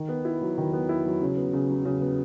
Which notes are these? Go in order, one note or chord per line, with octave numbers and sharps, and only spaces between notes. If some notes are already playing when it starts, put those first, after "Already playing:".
Already playing: D#3
B3
E4
F#3
D#3
B3
E4
F#3
C#3
B3
C#3
F#3
C#3
B3